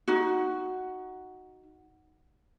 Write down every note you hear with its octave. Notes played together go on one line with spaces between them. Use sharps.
D#4 F#4